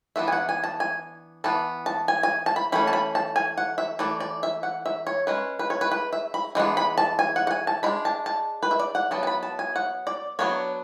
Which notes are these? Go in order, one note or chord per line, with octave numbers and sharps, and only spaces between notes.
E3 B3 D4 E5
G#5
F#5
G#5
A5
G#5
E3 B3 A5
A5
G#5
G#5
A5
B5
E3 A3 C#4 B5
A5
B5
A5
G#5
F#5
E5
E3 A3 D5
D5
E5
F#5
E5
C#5
G#3 C#4 B4
B4
C#5
B4
B4
E5
B5
E3 G#3 B3 D4
B5
A5
G#5
F#5
F#5
G#5
A5
G#3 D4 B5
A5
A5
B4
E5
D5
F#5
F#3 B3 A5
A5
B5
A5
G#5
F#5
D5
F#3 B3 D4 C#5